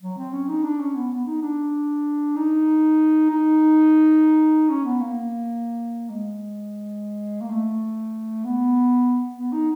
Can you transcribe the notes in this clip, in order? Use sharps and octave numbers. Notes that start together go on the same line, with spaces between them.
F#3
C4
C#4
D#4
D4
C#4
B3
B3
D#4
D4
D#4
D#4
C#4
B3
A#3
G#3
A#3
A3
B3
B3
D#4